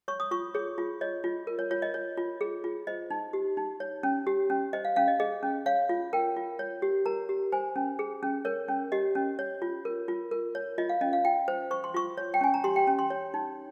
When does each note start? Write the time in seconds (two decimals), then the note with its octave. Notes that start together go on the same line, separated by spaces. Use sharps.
0.08 C#5 C#6
0.20 D#6
0.31 F4 C#6
0.54 G#4 C#5
0.78 F4
1.01 C#5 D#5
1.24 F4
1.47 A#4
1.59 C#5
1.71 F4 C#5
1.82 D#5
1.94 C#5
2.17 F4
2.41 G#4
2.64 F4
2.87 C5 D#5
3.11 D#4
3.33 G4
3.57 D#4
3.80 C#5
4.03 C#4
4.27 G4
4.50 C#4
4.73 C5 D#5
4.85 F5
4.96 C#4 F5
5.08 D#5
5.20 G#4 D#5
5.43 C#4
5.66 C#5 F5
5.89 F4
6.13 A#4 G5
6.37 F4
6.59 C#5
6.82 G4
7.06 A#4 A#5
7.29 G4
7.52 C5 G#5
7.76 C#4
7.99 G#4
8.23 C#4
8.45 A#4 C#5
8.68 C#4
8.92 G4 D#5
9.15 C#4
9.39 C#5
9.62 F4
9.85 A#4
10.08 F4
10.31 A#4
10.55 C#5
10.78 F4 D#5
10.89 F5
11.01 C#4 D#5
11.13 F5
11.24 F4 G5
11.48 C5
11.71 C5 C#6
11.84 C6
11.94 F4 C#6
12.17 C#5
12.34 G5
12.41 C#4 G#5
12.54 A#5
12.64 G4 C6
12.76 G5
12.87 C#4
12.99 C6
13.10 C#5
13.34 D#4